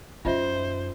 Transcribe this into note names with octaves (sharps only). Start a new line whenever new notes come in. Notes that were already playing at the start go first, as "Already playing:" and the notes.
F#2 D#4 F4 C5 D#5 E5